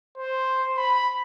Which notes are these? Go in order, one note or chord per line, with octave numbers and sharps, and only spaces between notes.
C5
B5